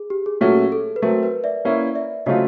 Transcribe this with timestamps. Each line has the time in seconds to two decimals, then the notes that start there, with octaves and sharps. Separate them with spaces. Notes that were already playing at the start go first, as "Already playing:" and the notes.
Already playing: G#4
0.10 G4
0.26 G#4
0.41 A#2 F#3 A3 C#4 F#4 A4
0.72 A4
0.96 B4
1.02 F#3 A3 C4 A#4
1.23 B4
1.44 D5 E5
1.65 A#3 C#4 E4
1.95 D5 E5
2.26 C#3 F#3 A3 C4 F4 C#5 D#5